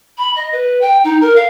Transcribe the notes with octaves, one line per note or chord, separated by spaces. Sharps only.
B5
D#5
B4
G5
D#4
A#4
F5